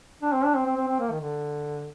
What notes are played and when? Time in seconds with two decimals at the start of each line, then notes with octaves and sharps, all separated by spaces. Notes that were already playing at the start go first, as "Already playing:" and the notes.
0.22 D4
0.33 C4
0.45 D4
0.55 C4
0.66 C4
0.77 C4
0.89 C4
1.00 A#3
1.11 D#3
1.21 D3